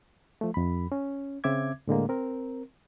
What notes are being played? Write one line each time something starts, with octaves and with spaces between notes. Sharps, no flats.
F3 A3
F2 B5
C#4
C#3 C4 E5 D6 G#6
A2 D3 G#3 A#3
C4 A#4